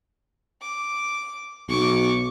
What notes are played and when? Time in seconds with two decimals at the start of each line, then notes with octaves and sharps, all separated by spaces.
0.61 D6
1.69 B1 C#6 D6